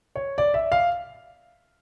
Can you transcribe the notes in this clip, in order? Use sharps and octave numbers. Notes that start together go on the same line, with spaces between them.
C#5
D5
E5
F5